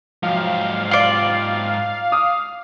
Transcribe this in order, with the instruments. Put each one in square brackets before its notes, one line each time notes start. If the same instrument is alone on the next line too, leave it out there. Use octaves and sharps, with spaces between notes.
[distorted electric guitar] G#2 G4 [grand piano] F3 F#3 [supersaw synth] F5
[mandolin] F4 D5
[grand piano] D6 D#6